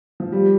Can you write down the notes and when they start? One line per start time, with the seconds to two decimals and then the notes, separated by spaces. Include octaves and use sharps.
0.20 F3
0.32 G3